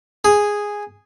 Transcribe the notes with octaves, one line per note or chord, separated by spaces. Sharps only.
G#4